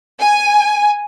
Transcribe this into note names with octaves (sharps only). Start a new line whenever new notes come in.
G#5